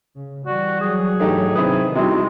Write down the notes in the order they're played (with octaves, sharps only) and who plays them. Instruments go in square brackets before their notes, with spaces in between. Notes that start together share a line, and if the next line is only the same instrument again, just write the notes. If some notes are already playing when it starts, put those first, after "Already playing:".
[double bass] C#3
[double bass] E3 G3 [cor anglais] F#4 [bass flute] D5
[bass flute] F#3 [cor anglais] G#4
[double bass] G#2 E3 [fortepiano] A3 D#4 G4
[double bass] C3 D#3 [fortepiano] C4 E4 B4 [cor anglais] G#4
[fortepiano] C3 E3 [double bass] G3 D#4 [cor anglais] G#3 [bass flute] F#4